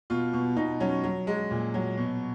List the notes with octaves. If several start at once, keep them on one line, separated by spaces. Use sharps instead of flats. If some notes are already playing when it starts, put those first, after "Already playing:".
B2 F4
B2
B2 D#4
F#3 C#4
F#3
F#3 G#3
A#2
F#3
B2